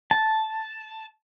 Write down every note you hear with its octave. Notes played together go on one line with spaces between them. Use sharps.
A5